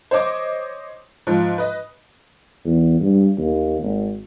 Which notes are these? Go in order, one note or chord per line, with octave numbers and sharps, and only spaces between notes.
C5 C#5 D#5 D6
G#2 F3
B4 D#5
E2
G2
D#2
G#1